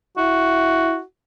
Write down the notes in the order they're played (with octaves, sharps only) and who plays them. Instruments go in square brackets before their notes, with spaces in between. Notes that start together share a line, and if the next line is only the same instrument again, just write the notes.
[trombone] E4 [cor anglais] F#4